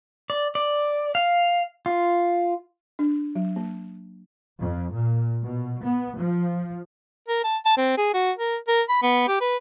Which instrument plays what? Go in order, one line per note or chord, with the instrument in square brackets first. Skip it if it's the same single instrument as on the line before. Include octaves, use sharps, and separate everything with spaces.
[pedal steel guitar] D5
D5
F5
F4
[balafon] D4
F#3
A#3
[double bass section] F2
A#2
B2
B3
F3
[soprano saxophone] A#4
A5
A5
C4
G#4
F#4
A#4
A#4
B5
B3
G4
B4